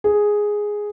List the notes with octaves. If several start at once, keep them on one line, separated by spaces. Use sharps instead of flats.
G#4